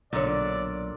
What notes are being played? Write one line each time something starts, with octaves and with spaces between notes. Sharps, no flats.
B1 A#2 D3 C#5 D5